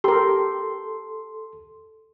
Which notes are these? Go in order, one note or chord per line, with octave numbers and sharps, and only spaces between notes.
G4 A4 A#4 C6